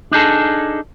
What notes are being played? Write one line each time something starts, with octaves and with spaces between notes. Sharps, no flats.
D4 D#4 G#4 A4